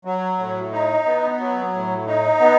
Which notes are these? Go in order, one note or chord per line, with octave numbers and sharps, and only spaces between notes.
F#3
A2
D#4
B3
F#3
A2
D#4
B3